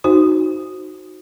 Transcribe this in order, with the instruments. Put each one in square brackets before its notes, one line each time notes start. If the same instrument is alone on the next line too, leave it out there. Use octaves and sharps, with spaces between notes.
[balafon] D#4 F#4 C5